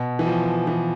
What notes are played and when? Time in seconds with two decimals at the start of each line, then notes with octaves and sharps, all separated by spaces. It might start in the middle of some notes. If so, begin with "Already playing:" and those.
Already playing: B2
0.19 E3
0.26 F3
0.67 E3